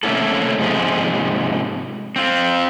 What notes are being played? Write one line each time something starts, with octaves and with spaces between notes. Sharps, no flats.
C3 A3 A#3 C#4 E4 A4
G#2 C3 F3 G#4
C4 F4